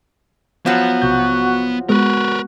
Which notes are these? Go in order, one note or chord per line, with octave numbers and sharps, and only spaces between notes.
F3 F#3 B3
B1 C3 F#4 G6
G#3 B3 F#4 A#4 B4